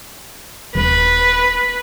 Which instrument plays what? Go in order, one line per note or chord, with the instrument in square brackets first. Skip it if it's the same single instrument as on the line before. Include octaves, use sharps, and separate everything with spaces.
[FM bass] D#1 [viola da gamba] B4